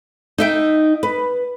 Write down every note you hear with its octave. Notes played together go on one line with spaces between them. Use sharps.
D#4 E5 G5
B4